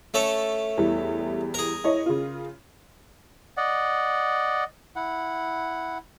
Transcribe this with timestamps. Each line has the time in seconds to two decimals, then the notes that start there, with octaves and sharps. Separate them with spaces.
0.14 A3 C#4 A4
0.77 E2 E3 G3
1.54 G#4 A#4
1.84 E4 C#5 D#5
2.06 C#3 F4
3.57 D5 D#5 F#5
4.96 E4 F#5